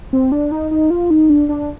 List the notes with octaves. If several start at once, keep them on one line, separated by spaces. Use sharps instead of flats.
C4
D4
D#4
D#4
F4
D#4
D4
D4